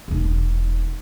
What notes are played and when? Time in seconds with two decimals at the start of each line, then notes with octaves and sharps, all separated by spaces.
0.08 E1 D#4